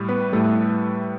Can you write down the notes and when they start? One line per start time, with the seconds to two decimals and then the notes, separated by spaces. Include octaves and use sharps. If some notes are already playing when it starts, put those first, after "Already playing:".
Already playing: A2 G3
0.09 B3 B4
0.32 A2 G3 A3 A4